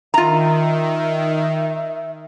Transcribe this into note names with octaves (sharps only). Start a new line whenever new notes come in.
D#3 F4 E5 A#5